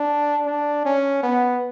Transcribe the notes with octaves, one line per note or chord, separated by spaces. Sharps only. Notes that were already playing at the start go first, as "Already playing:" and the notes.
Already playing: D4
D4
C#4
B3